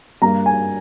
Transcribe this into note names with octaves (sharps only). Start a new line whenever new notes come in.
G2 G3 A#3 A#5
G#5